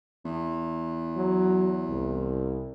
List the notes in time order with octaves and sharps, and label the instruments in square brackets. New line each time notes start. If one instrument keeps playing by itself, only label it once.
[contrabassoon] E2
[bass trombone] F#3
C2